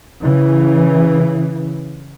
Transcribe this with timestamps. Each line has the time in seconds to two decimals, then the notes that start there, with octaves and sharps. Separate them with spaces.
0.22 C#3 E3